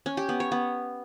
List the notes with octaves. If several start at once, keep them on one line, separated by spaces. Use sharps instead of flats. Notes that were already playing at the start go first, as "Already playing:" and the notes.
C#4
G4
B3
C#5
B3